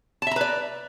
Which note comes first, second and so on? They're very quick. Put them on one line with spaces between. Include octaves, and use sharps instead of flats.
A5 E5 A#5 B4 D5